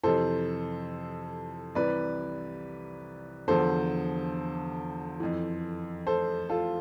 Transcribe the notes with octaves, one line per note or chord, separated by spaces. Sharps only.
F2 C3 E3 A4 C5
C2 C3 E3 B4 D5
E2 D3 F3 A4 C5
F2 E3
A4 C5
F4 A4